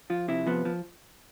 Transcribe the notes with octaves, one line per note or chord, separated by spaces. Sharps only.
F3 F4
C3 E4
F3 B3
F3